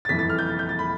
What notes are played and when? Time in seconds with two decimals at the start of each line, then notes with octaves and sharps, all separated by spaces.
0.05 A6
0.09 G1 F2 E3 B6
0.19 A6
0.30 F6
0.39 G6
0.49 A6
0.59 G6
0.69 A6
0.79 B5